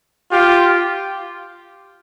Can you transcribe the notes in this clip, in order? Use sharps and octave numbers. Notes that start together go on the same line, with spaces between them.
F4 G4